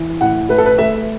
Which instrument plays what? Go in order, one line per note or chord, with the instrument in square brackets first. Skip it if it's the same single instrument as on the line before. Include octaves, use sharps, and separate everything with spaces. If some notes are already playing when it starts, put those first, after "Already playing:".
Already playing: [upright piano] E3
A2 F#5
A3 B4
A4
B4
A3 E5